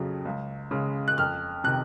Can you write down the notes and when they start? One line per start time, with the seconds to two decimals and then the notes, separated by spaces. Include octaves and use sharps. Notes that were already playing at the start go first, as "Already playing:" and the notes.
Already playing: F2 C#3 F#3
0.25 C#2
0.71 C#3 G#3
1.08 F#6
1.18 F2 F6
1.64 C3 D#3 F#6